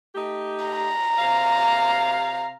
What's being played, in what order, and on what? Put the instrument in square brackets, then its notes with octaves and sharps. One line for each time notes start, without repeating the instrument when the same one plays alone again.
[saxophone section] A3 D#4 G4
[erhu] A#5
[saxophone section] C3 F5